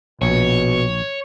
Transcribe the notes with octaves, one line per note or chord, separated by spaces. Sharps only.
A#1 B2 C#5